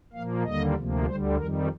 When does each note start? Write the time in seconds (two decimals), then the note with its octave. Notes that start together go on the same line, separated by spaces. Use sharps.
0.13 A#2 F3 A#3 F5
0.44 D#2 D3 G3 A#3 D#5
0.75 D2 C3 F3 A#3
1.06 D2 D3 G3 C5
1.37 F2 D#3 G3 A#4